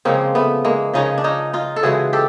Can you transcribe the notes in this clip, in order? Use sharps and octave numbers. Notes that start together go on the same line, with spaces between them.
C#3 F3 G#3 A#3 C4
A3 B3
G#3 A#3
C#3 F3 G#3 C#4 D#4
D4
C#4 D#4
D#4 F4
A4
C#3 E3 G#3 F#4 G#4
G4 A4